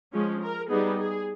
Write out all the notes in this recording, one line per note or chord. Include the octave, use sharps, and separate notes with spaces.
F3 G#3 C#4
A#4
G3 B3 D#4 G#4
G#4